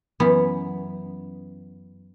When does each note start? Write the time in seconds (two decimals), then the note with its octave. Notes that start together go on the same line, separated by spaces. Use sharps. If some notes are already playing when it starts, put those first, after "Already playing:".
0.20 F#2 E3 B3